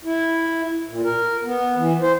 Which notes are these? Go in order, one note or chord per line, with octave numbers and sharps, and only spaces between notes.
E4
A#2
A#4
B3
E3
C5